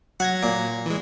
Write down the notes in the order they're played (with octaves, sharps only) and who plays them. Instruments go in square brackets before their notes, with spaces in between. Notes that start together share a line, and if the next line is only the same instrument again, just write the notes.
[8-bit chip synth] F#3 G#6 A#6 [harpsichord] F#5
[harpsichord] A#2
[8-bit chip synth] E3 G#3